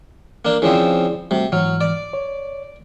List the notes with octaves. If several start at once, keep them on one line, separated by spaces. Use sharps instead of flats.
A#3 D4
C#3 F3 C4 E4 G#4 D5
C3 G3 A3 F#4
G#2 E3 F#3 F6
D5
C#5